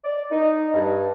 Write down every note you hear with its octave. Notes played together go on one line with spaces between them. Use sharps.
D5
D#4
G2